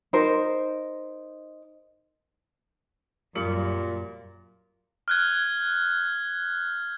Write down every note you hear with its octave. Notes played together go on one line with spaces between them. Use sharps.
D#4 A#4 C5
F#2 A#2 G3 C#7 F#7
F6 F#6 G#6